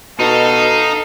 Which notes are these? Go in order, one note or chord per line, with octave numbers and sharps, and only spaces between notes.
B2 D#4 A4 F5